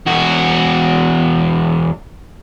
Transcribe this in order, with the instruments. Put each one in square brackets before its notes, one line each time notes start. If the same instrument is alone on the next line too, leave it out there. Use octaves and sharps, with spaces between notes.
[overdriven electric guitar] E2 F#4